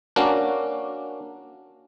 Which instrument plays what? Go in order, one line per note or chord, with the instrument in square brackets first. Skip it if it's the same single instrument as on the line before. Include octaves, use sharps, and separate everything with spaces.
[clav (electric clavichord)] A#3 C#4 D4 F#4